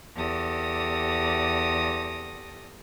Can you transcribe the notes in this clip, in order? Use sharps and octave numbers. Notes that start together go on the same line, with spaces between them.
E2 G4 A4 D5 D#6 A#6